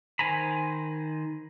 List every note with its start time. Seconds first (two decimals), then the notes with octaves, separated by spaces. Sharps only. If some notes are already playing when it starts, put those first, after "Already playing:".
0.19 D#3 C5 G#5 A#5 B5